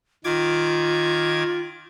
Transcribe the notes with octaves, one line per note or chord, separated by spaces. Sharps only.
D#3 F4 D6 G#6